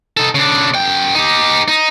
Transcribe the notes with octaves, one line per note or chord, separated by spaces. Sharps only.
D#4 A4
C#3 D4
F#2 G5
D#4 G4
D#4